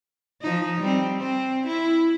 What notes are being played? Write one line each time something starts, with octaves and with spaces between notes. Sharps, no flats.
F3 D#4
G3 C4
C4
E4